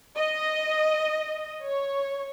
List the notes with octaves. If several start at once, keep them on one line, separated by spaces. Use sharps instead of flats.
D#5
C#5